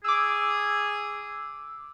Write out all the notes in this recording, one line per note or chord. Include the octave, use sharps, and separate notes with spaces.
G#4 D6 E6